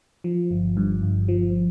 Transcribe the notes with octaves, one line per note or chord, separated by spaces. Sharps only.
F3
G1
G2
G1
F3